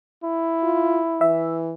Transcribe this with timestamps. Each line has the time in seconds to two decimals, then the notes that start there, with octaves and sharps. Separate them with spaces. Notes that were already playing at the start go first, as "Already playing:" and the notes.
0.24 E4
0.63 F4
1.21 E3 E5